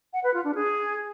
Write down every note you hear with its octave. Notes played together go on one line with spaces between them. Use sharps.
F#5
B4
F4
D4
G#4